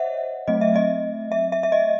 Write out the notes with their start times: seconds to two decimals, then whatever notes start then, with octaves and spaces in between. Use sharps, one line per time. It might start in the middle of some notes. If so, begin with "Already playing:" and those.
Already playing: C5 C#5 D#5 E5 F#5
0.48 F#3 A3 C4 D#5
0.61 E5
0.76 D#5
1.32 E5
1.52 E5
1.63 E5
1.72 D#5